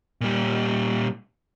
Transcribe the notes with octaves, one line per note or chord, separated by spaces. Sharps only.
A#2 G3